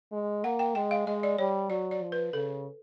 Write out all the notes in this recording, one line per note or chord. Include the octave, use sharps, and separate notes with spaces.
G#3
A#3 F#5
G5
G#3 G5
F5
G#3 D#5
D5
G3 C#5
F#3 D5
D5
F3
B4
C#3 A4